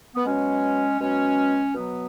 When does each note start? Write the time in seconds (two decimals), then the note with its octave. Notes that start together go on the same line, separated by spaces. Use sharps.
0.15 B3
0.25 B2 F#3 G#3 C#4
1.00 B2 F#3 G#3 C#4
1.74 B2 F#3 B3